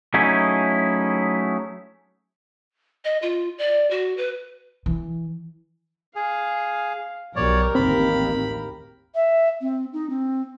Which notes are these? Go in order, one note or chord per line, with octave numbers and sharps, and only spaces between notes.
F#3 A3 C#4 D#4 E4 G#4
D#5
F4
D5
F#4
B4
E3
G#4 F5
B1 G4 A#4 C#5 D5
A1 D#2 C4 B5
E5
C4
D#4
C4